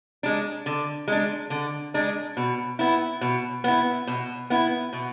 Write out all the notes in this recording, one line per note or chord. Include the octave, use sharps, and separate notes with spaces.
G#3 D4
D3
G#3 D4
D3
G#3 D4
B2
B3 E4
B2
B3 E4
B2
B3 E4
B2